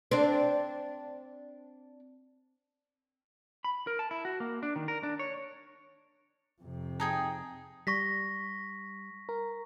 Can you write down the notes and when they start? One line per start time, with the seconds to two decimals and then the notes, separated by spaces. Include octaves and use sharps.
0.11 C4 D4
3.64 B5
3.87 A#4
3.99 A5
4.11 E4
4.25 F#4
4.40 A#3
4.63 D4
4.76 D#3
4.88 A#4
5.03 D4
5.19 C#5
6.61 F2 C3
7.00 D#4 G#4 G5 A5 A#5 G#6
7.87 G3 C#6 A#6 B6
9.29 A#4